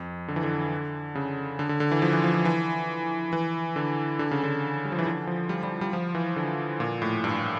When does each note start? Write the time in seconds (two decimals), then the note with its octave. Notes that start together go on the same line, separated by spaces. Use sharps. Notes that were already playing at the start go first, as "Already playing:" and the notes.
Already playing: F2
0.28 D3
0.36 E3
0.43 D3
1.15 C#3
1.59 D3
1.69 D3
1.80 D3
1.91 E3
2.02 F3
2.13 E3
2.24 F3
2.34 F3
2.45 E3
3.33 E3
3.76 D3
4.19 D3
4.31 C#3
4.43 D3
4.85 G3
4.92 F3
4.99 E3
5.06 D3
5.27 F3
5.49 G3
5.63 G3
5.81 G3
5.93 F3
6.15 E3
6.36 D3
6.80 A#2
7.02 A2
7.24 G2